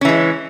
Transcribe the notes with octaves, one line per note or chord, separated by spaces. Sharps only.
E3 G#3 C#4